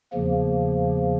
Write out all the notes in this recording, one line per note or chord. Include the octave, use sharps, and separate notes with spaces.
E2 C#3 F3 A#3